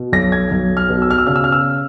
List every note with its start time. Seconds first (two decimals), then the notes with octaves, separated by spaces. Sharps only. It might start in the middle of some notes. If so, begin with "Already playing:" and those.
Already playing: B2
0.12 B1 A#6
0.32 G#6
0.51 B1
0.77 F6
0.90 B2
1.02 E6
1.11 F6
1.18 E6
1.27 C#3 F6
1.36 E6
1.44 F6
1.52 E6